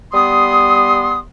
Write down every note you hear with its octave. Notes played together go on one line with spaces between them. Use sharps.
G3 B3 C6 D#6